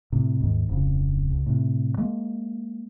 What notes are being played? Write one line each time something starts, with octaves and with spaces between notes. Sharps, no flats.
A2 C3
D#2 G#2
D1 F2 C#3
C#2
A2 C3
G#3 A#3